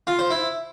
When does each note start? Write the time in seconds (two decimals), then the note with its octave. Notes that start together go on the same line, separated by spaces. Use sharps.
0.07 F4
0.19 C5
0.30 E4